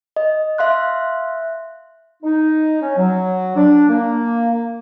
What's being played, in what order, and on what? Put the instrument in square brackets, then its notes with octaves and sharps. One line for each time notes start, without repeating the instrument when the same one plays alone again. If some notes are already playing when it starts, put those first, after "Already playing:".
[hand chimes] D#5
E5 F5 C6 F#6
[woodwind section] D#4
C#4
F#3
D4
A#3